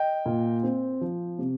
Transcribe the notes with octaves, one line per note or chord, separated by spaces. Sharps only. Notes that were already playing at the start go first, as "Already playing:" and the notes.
Already playing: D#5 G5
A#2
C4
F3
C3